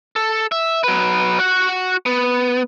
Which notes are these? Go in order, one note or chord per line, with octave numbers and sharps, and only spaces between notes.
A4
E5
F#3 B4
F#4 F#5
B3